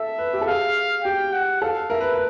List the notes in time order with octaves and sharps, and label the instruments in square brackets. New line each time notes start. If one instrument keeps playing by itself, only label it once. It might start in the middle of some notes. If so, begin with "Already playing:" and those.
Already playing: [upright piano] A4 [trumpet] E5
[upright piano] B4
G4
A4
[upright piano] G#4 [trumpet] F5
[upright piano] G4 [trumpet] G5
[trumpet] F#5
[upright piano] A4 [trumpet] F5
[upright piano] A#4 [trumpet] E5
[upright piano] B4
B4